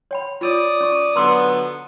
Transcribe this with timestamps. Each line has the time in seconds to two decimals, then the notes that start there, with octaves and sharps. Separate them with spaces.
0.11 C#5 G5 B5
0.41 F4 A#4 C#5 D5 D#6
0.81 C#4 C#6
1.16 D3 F#3 B3 A#5 C6 E6